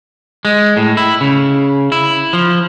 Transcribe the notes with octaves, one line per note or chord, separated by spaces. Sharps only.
G#3
A2
E4
C#3
E4
F3